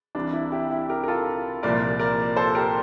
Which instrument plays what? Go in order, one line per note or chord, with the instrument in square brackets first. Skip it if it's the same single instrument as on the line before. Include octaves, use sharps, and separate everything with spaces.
[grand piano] C2 C3 E3 D4
E4
E4 G4
E4 G4
G4 A#4
A#4
F4 A4
C2 A#2 F3 A#4 D5
A#4 D5
A4 C5
G4 A#4